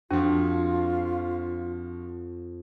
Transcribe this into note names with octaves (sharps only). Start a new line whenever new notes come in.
F2 F3 D4 F4 F#4